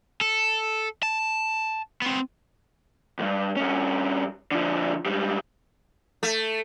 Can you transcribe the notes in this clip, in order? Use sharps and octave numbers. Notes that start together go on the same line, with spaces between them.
A4
A5
B3 C4
D2 G2
G2 C#4
D3 F3
G#2 G3
A3